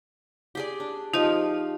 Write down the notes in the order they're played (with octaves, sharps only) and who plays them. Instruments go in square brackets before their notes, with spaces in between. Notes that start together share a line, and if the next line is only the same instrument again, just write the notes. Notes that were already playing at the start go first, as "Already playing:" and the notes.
[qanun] G4 G#4 D5
D4
[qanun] F3 [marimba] D#4 G4 D#5